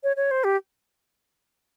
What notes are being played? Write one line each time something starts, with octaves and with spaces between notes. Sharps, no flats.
C#5
C#5
C5
G4